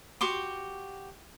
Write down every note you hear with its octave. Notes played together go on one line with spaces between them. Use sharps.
F#4 G4 C6 D6